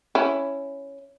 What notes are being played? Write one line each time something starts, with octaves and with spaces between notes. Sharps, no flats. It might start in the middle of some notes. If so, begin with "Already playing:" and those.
C#4 E4